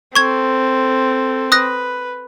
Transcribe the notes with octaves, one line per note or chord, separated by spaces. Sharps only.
C4 A4 C#6 G#6
B4 D#6 F#6 A#6